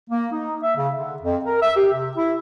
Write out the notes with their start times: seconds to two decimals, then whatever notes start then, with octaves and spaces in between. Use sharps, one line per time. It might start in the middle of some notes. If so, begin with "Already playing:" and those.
0.10 A#3
0.32 D#4
0.63 E5
0.76 C#3
0.95 D3
1.22 F2
1.45 A#4
1.62 E5
1.76 G4
1.92 C3
2.17 E4